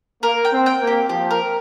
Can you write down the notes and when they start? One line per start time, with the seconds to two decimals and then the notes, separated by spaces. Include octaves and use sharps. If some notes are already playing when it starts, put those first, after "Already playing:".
0.23 A#3 A#4
0.45 G5
0.51 C4
0.66 G5
0.80 A#3
0.87 G4
1.09 F3 G4
1.31 A#4